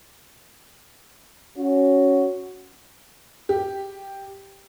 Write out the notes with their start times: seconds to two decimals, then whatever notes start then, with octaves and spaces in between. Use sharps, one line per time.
1.57 C#4 F#4
3.49 G4